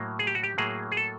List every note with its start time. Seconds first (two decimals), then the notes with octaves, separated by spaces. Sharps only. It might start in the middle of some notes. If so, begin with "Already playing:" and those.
Already playing: A2 F#3 A#3
0.19 G#4
0.27 G4
0.35 F#4
0.43 G4
0.58 A2 F#3 A#3 G#4
0.92 G#4
0.97 A4